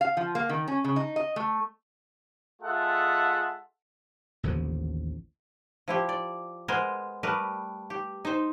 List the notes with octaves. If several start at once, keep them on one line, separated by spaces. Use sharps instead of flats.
F5
F3
A#3
D#3
C#4
C#3
D#4
D#5
A3
G#3 F4 G#4 A4 E5 F#5
A1 D#2 D3 F3
F3 E4 G4
D5
G#3 B3 A#4 C5 G#5
G3 A3 A#4 B4
G4
D#4 C5